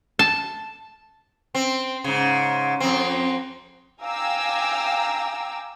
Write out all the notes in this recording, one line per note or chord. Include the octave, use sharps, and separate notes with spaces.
A5
C4
G#2 C#3
F2 C4
F5 G5 G#5 A#5 D6 E6